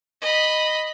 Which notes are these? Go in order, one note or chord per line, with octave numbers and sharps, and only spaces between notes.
D#5 B5